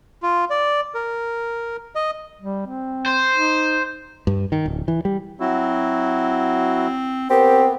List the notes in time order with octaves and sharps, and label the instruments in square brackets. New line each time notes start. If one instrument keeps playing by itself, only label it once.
[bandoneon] F4
D5
A#4
D#5
[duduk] G3
C4
[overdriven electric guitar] C5
[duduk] D#4
[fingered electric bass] G2
D#3
D1
E3
G3
[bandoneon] F#3 E4 F#4 [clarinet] C4
[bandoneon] B3 [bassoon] C4 [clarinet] G4 [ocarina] A#4